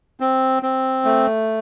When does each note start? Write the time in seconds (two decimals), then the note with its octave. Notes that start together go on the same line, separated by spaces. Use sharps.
0.20 C4
0.63 C4
1.05 A3